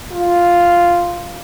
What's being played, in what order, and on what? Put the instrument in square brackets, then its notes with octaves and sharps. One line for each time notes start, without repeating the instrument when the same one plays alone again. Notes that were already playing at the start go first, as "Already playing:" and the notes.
[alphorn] F4